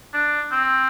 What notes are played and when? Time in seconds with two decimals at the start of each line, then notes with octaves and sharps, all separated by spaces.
0.14 D4
0.52 C4